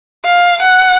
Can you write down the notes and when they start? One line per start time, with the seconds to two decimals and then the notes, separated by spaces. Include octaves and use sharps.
0.25 F5
0.62 F#5